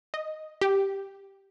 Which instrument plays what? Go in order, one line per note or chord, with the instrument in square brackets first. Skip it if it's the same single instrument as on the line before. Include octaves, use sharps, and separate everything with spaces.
[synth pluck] D#5
G4